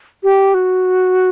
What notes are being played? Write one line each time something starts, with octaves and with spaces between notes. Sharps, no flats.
G4
F#4